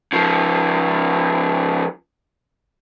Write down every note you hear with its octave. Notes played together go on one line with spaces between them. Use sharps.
C#3 F3